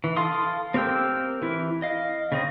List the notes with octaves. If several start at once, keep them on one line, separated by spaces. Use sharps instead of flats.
E3
A4 F5 C6 D#6
C4 G4 A#4 G5 E6
E3 E4
D#5 F5
C#3 C4 D#5